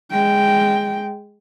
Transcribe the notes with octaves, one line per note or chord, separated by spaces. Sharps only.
G#3 G5